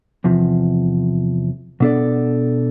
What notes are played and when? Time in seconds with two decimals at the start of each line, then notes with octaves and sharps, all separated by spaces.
0.24 E2 C3 F3
1.80 B2 B3 D4 A4 D5